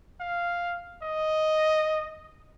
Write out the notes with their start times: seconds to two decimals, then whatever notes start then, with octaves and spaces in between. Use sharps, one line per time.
0.21 F5
1.02 D#5